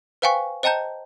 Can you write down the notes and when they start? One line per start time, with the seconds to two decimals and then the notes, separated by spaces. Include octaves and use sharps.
0.22 B4 C5 F5 G5 G#5 C#6
0.63 C5 D#5 G5 A5 A#5 G6